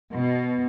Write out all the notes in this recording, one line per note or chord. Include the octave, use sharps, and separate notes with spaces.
B2